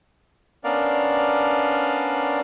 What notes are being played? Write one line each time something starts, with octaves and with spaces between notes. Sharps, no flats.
B3 C#4 D4 A#4 D5 F5